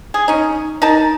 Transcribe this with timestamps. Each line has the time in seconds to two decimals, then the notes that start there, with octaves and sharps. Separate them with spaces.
0.14 G#4
0.28 C#4 D#4
0.82 D#4 A#4 A5